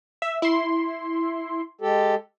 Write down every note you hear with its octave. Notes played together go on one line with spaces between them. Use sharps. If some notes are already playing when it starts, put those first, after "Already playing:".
E5
E4 C6
G#3 G4 A4